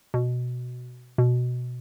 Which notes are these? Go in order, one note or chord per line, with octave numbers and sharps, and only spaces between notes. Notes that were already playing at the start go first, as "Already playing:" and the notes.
B2
B2